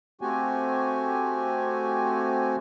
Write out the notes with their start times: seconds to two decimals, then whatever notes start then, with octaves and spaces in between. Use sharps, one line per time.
0.21 A3 C4 F#4 G4 G#5